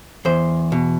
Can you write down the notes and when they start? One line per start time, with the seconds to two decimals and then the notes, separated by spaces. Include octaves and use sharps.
0.25 E2 C5
0.72 B2